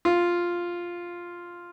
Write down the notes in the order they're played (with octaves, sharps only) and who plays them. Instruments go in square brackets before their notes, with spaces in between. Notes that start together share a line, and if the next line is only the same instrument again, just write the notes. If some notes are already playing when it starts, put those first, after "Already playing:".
[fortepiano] F4